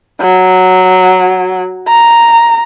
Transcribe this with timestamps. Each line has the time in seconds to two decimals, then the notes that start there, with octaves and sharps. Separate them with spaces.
0.21 F#3
1.88 A#5